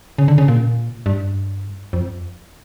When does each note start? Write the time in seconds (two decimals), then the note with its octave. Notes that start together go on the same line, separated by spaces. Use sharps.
0.18 C#3
0.28 D3
0.38 C#3
0.48 A#2
1.06 G2
1.93 F2